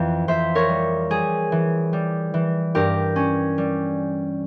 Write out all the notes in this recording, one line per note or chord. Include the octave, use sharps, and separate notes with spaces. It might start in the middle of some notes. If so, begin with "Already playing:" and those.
Already playing: F2 E3 G5
F2 C5 E5
A#4 C#5
G3
G3 G#4
E3
G3
E3
G2 G4 A#4
C#4
G3